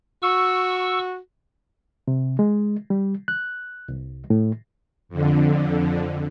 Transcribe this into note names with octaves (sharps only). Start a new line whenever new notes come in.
F#4 C#6 E6
C3
G#3
G3
F#6
C2
A2
F2 D3